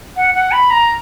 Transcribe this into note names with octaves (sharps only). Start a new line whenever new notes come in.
F#5
F#5
B5
A#5